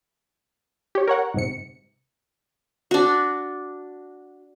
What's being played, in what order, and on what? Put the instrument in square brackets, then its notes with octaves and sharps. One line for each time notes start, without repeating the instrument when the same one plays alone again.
[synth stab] G4 C#5
A#4 C#5 F#5
G1 G#2 C3 C#7
[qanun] D4 F#4